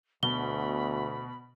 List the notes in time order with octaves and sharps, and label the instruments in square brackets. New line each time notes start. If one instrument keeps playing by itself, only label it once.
[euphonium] D2 [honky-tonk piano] B2 [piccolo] B5 [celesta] G7